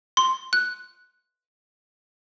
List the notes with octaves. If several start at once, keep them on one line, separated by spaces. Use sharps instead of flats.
C6
F#6